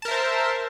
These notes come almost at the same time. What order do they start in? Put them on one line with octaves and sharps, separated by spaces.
A5 A#4 E5 C5